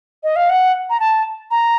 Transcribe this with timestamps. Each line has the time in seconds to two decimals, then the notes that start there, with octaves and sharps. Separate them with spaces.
0.23 D#5
0.36 F5
0.50 F#5
0.90 A#5
1.00 A5
1.51 A#5